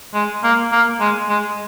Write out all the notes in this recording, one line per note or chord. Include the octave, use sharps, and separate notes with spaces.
G#3
A#3
A#3
G#3
G#3